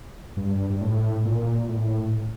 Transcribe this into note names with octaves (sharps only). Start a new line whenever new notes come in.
G2
G2
A2
A#2
A2